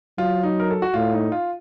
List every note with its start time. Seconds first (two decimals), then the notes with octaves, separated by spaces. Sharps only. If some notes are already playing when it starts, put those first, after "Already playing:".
0.18 F#3 F4
0.43 D#4
0.60 A#4
0.71 A4
0.82 F#4
0.94 A2 F4
1.14 D#4
1.32 F4